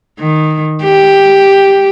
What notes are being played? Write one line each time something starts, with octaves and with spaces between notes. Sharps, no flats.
D#3
G4